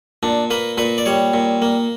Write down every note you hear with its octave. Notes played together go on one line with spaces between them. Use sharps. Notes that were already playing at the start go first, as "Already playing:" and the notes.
A#2 D4
A#3 B4
A#2 B4
D5
G3 C#5
A#2
A#3